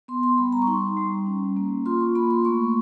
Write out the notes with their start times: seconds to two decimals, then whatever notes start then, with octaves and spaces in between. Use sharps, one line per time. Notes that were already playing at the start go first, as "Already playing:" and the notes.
0.08 B3 C6
0.23 C6
0.38 G3 B5
0.52 A#5
0.62 C#6
0.67 D#4 C6
0.97 G3
1.26 C#4
1.56 A#3
1.86 F4 C6
2.01 C#6
2.15 A#3 B5
2.31 C6
2.45 A3 C#6